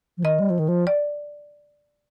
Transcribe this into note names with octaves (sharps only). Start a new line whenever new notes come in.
F3
D#3 D#5
G3
F3
D#3
F3
D5